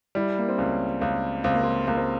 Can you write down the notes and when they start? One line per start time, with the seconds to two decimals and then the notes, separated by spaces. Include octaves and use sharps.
0.15 G3 E4
0.39 A#3
0.49 C4
0.58 C#2 C#4
1.01 C#2
1.44 C#2 C4
1.54 A#3
1.63 C4
1.87 C#2 A#3
1.97 C4